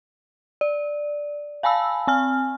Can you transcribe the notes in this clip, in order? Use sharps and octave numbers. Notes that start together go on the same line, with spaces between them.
D5
F5 G#5 A5 B5 E6
C4 G#5 F6